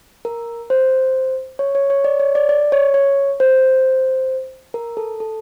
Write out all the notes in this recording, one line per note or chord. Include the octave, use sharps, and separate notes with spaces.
A#4
C5
C#5
C#5
C#5
D5
C#5
D5
D5
C#5
C#5
C5
A#4
A4
A4